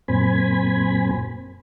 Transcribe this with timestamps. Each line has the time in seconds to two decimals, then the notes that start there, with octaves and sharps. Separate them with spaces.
0.08 F#2 A#2 C4 G#5 B5